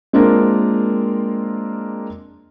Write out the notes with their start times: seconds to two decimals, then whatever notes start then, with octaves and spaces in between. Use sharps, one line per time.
0.13 G#3 A#3 C4 D4 F4 A#4